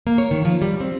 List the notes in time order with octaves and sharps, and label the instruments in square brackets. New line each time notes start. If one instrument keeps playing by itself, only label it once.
[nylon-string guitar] A#3
C#5
D#3
F3
G3
C4